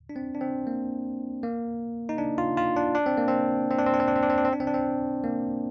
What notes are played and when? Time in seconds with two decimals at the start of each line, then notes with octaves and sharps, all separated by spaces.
0.09 D4
0.16 C4
0.35 D4
0.41 C4
0.67 A#3
1.43 A#3
2.09 D#4
2.18 D4
2.38 F4
2.57 F4
2.77 D4
2.95 D4
3.06 C4
3.17 A#3
3.28 C4
3.71 C4
3.78 D4
3.86 C4
3.94 D4
4.00 C4
4.08 D4
4.16 C4
4.23 D4
4.30 C4
4.38 D4
4.45 C4
4.53 D4
4.60 C4
4.67 D4
4.74 C4
5.24 A#3